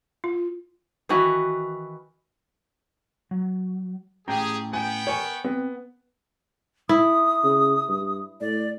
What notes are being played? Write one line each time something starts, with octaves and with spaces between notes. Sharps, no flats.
F4
D#3 E3 F#4 B4
F#3
A2 C#4 G4 G#4 G5 A#5
B3 G5 G#5
A#4 C#5 G#5
B3 C4
E4 D#6
C#3
G2
A2 D5